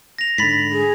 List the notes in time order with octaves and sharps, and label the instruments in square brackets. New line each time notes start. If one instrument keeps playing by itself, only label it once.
[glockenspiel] A#6 F7
[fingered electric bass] G#2 D3 [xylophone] B5 A6 B6
[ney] G#4